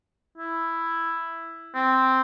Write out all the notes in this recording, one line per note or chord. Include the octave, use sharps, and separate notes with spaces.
E4
C4